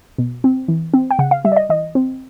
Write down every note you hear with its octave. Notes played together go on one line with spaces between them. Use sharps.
B2
C4
E3
C4
G5
C#3 F#5
F5
G3 E5
D5
D#5
E3 D#5
C4